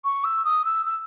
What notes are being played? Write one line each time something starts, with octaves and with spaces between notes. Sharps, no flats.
C#6
E6
D#6
E6
E6